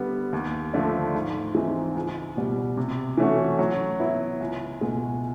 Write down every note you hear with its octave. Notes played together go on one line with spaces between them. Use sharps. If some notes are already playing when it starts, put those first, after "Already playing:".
Already playing: D3 G3 B3
D#2
D3 F3 A3 D4
G#2
E3 G#3 C4 D#4
C#2
B2 G3
C3
E3 A3 C#4 F#4
F#3
B3 E4
C#2
B2 G#3